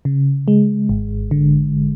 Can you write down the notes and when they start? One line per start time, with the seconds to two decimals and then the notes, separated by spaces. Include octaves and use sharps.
0.05 C#3
0.48 G#3
0.89 G#1
1.31 D3